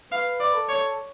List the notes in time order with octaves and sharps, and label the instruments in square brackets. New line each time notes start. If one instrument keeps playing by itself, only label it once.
[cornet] B4 [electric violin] F5
[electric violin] D5
[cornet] A4
[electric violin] C#5